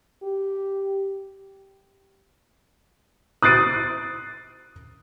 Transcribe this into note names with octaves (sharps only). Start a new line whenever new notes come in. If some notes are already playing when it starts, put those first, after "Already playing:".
G4
D#6 F#6 A6 C7 D7 D#7